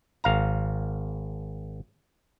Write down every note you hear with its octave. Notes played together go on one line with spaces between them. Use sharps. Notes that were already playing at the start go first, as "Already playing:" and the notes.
G#1 F5 A#5